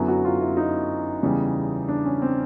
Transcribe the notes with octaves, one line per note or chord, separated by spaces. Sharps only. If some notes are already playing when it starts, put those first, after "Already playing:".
Already playing: F#2 D3 F#3 B3 E4
F#4
F4
E4
D#4
E2 C#3 E3 G3
D4
C#4
C4